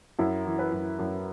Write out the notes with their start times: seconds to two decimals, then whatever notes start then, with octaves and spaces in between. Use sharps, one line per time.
0.19 F#2 E4
0.46 E3
0.59 B4
0.73 F#2
0.99 F#2